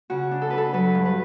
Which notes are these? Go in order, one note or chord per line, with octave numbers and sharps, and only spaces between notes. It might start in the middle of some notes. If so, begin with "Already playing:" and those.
C#3 F#4
D4
A4
D4 B4
A4
F#3 B4
G2
B4